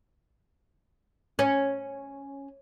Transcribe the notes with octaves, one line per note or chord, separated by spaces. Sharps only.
C#4